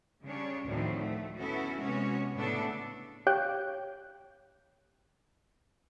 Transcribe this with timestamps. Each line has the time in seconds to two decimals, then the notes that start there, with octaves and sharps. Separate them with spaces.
0.23 C#3 G3 D4 C#5
0.67 D2 A2 D#3 F3 C4
0.98 A3
1.36 B3 C#4 E4 F#4 A4
1.79 C3 G#3 B3 C#4 F#4 C#5
2.35 A2 C#3 A3 B3 D4 A4
3.27 G4 C#5 F5 G5 F#6 G6